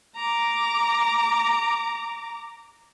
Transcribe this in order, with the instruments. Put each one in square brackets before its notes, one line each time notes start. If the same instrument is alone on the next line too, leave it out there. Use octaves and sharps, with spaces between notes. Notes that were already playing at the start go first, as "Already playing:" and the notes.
[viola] A#5 D6